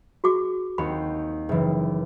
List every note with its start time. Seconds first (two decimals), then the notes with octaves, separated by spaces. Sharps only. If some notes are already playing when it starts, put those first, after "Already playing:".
0.24 F#4 G#4 D6
0.78 D#2 C4 F#4 B5
1.49 F#1 E3